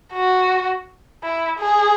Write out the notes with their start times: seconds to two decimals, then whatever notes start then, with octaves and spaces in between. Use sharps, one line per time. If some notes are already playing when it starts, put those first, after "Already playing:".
0.13 F#4
1.24 E4
1.60 G#4